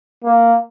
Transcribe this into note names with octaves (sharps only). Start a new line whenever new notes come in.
A#3